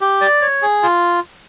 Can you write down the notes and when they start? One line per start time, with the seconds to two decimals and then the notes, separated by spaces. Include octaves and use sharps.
0.01 G4
0.21 D5
0.42 C#5
0.62 G#4
0.83 F4